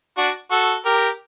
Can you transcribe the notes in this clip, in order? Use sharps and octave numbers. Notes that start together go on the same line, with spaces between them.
D4 F#4
F#4 A4
G4 A#4